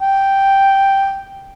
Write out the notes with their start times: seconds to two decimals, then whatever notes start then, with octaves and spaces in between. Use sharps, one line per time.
0.01 G5